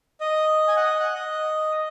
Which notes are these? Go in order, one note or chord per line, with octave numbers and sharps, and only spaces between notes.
D#5
G#5
F#5
D#5
F#5
D#5